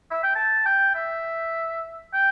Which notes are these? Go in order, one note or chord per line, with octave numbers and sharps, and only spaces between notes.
E5
G5
A5
G5
E5
G5